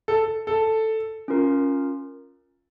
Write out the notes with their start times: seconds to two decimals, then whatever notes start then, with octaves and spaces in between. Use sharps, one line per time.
0.08 A4
0.47 A4
1.28 C#4 F4 A#4